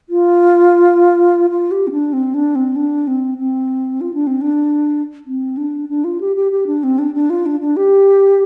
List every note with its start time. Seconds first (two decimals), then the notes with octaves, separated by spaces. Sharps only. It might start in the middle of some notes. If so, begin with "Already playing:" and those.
0.09 F4
1.50 F4
1.71 G4
1.87 C4
1.92 D4
2.13 C4
2.34 D4
2.55 C4
2.76 D4
3.07 C4
3.38 C4
4.01 F4
4.14 D4
4.27 C4
4.41 D4
5.26 C4
5.57 D4
5.89 D4
6.04 F4
6.21 G4
6.36 G4
6.52 G4
6.67 D4
6.83 C4
6.99 D4
7.14 D4
7.30 F4
7.46 D4
7.61 D4
7.77 G4